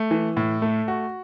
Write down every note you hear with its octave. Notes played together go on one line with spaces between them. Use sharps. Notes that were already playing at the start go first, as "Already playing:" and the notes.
Already playing: A3
E3
A2
A3
F#4